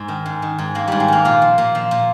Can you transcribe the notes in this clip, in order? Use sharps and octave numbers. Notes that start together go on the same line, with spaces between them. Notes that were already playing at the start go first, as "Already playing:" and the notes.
Already playing: G#2 G#3
D#3
G#2
D#3
G#2
D#3 A#3
G#2 G3
G#3
D#3 A#3
A#2 F4
F3
A#2
F3
A#2